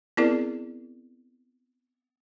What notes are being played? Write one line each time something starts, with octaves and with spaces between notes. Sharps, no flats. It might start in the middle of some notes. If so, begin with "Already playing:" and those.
B3 C4 E4 G#4 A#4 D5